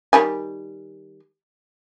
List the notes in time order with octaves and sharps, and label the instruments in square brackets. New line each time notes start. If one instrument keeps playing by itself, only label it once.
[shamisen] D#3 G3 G#5